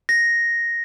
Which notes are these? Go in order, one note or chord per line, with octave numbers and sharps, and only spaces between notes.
A#6